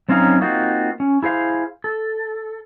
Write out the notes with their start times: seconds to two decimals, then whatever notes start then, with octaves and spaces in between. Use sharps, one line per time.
0.09 F#3 C4 C#4 D#4 F5 A#5
0.41 A#3 C4 D#4 F4 F#4
1.00 C#4
1.23 E4 G#4 C5 F5
1.84 A4